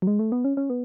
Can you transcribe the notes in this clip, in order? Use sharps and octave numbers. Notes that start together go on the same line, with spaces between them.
F#3
G#3
A3
B3
C#4
C#4
B3